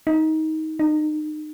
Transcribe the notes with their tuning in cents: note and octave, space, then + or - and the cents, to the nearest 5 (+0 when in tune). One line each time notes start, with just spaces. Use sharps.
D#4 +20
D#4 -30